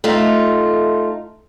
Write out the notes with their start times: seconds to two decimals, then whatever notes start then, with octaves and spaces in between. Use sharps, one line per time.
0.04 A3 D#4 F4